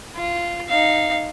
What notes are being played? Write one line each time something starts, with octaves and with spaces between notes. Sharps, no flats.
F4
D#4 F5